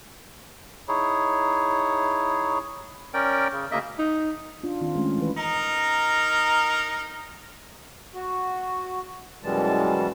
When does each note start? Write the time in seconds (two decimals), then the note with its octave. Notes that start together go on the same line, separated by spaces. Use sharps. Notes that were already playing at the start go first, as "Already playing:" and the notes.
0.88 D#4 E4 G#4 C#5
3.14 C#4 A#4 D5 G5
3.52 C#3
3.71 D2 C#3 A#3 D#5 E5
3.99 D#4
4.64 D4 F4
4.81 D#3 C4 F4
4.95 G#3 A3 C#4
5.18 E3 B4
5.37 D#4 A#4
8.15 F#4
9.43 F#2 B2 E3 G3 G#3 A5